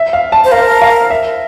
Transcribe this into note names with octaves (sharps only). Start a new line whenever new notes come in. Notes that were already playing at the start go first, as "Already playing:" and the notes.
Already playing: E5
F5
A5
C5
A#4 F5
F5
E5